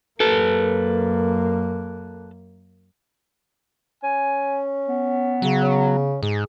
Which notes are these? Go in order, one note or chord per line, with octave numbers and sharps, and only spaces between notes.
F#2 A#3 A4 B4
C#4 G#5
B3
C#3 F#3
C#4
G#2 G#4